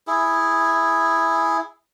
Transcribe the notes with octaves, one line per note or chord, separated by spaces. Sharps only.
E4 G#4